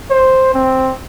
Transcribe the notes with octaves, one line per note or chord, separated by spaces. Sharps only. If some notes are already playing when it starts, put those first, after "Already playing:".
C5
C4